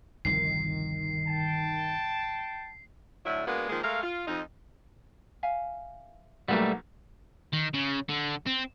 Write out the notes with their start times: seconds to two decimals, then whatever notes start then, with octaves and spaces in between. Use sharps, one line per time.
0.25 G1 C2 D#3 F3 C7
1.27 G5 A5
3.25 A2 D3 F#3 E4
3.47 G#3 A#3 B3 D4 F#4
3.69 D#3 F3 G#3 A#3
3.83 G#3 A3 A#4 F5
4.03 F4
4.28 F2 F3 D#4
5.43 E5 F5 G#5
6.48 B1 G3 A3 A#3 B4 F5 F#5
7.53 D#3
7.74 C#3
8.09 D3
8.46 C4